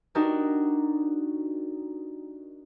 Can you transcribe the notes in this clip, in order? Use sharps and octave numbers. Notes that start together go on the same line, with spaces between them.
D4 D#4 F#4 G4 A#4